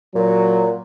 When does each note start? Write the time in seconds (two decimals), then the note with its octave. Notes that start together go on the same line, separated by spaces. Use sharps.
0.15 A#2 F#3